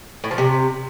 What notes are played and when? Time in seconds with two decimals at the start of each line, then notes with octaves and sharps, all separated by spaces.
0.24 A2
0.31 F3
0.38 C3